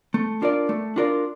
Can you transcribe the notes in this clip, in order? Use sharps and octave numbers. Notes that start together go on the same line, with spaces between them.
A3
D4 F4 A#4 D5
A3
D4 F4 A#4 D5